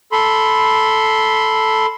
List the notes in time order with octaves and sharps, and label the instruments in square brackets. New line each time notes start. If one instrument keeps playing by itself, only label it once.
[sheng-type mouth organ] A4 B5 C6